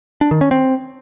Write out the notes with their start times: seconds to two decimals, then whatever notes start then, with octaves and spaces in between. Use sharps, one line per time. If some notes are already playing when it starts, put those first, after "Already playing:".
0.21 D4
0.31 D#3
0.41 C#4
0.51 C4